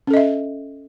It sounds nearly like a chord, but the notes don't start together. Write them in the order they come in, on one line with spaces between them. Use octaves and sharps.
C#4 A4 D#5 E5